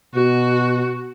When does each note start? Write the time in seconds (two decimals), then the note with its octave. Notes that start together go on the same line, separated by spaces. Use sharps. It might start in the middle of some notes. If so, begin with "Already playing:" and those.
0.14 B2 F#4